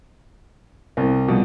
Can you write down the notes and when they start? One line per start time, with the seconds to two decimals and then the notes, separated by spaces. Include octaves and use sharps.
0.97 C2
1.28 B2 F3 G3